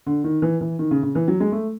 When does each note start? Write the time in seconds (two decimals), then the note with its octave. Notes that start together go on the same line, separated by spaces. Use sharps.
0.06 D3
0.24 D#3
0.42 E3
0.61 E3
0.79 D#3
0.91 C#3
1.03 C#3
1.15 E3
1.28 F#3
1.40 G#3
1.52 A3